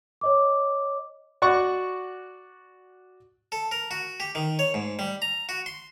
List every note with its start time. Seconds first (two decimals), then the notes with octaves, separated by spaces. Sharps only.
0.21 C#5 D#5 D6
1.42 F#4 D5 F#5 C#6
3.52 A4
3.71 A#4
3.91 F#4
4.20 G4
4.35 D#3
4.59 C#5
4.74 G#2
4.99 G3
5.22 A#5
5.49 F#4
5.66 C6